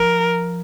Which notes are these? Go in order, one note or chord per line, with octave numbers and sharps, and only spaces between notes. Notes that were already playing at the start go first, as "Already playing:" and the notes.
Already playing: F3 A#4